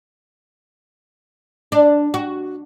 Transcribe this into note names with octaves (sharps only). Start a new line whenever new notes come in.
D4
F#4